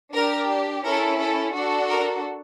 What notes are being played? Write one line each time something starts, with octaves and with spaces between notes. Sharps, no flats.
D4 G4 A#4
C#4 E4 A4 A#4
A4
D4 F#4 A4
A#4